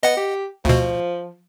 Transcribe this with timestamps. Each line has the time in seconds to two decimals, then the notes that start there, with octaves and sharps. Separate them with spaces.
0.03 B3 D#5 F#5
0.17 G4
0.65 D2 B2 F3